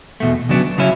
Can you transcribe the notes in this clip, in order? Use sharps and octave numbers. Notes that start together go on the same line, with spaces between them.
E2 B2 A3
D2 C#3 F#3 B3 D4
C#3 F#3 C#4 E4